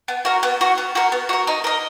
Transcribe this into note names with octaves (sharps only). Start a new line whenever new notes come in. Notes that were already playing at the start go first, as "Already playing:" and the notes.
B3
F#4 A#4
B3
F#4 A#4
B3
F#4 A#4
B3
F#4 A#4
D#4
A#4 D#5